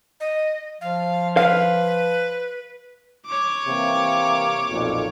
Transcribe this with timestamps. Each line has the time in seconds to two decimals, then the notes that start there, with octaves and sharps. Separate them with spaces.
0.20 D#5
0.81 F3 F5
1.37 B4 F5
3.26 C#5 D6
3.67 C3 E3 A#3
4.70 B1 F2 A#2